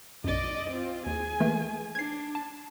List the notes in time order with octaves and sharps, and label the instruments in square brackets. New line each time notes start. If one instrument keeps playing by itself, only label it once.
[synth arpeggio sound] B1 F#2 [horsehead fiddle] D5 D#5
[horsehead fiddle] C4 F4
[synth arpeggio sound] D#2 [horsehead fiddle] G#4 G#5
[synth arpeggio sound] E3 A3 A#3
[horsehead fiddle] D4 [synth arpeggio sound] G#6 C7
[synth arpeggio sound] A5